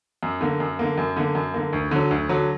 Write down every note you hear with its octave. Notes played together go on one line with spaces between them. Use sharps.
F#2
D3 A#3
F#2
D3 A#3
F#2
D3 A#3
F#2
D3 A#3
D2
D3 F#3
D2
D3 F#3